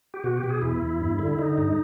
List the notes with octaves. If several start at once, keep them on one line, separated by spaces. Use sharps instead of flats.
G4
B2 F#4
G4
B2
G#4
E2 E4
E2
G2
D3
D3 D#4
G2